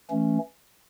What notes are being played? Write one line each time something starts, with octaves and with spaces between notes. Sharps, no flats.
E3 A3 C#4